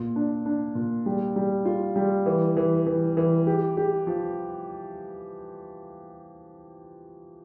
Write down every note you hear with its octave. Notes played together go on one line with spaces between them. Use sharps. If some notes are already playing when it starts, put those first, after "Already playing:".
Already playing: A#2
D4
D4
A#2
G3
G3
F4
G3
E3
E3
E3
E3
G4
G4
F3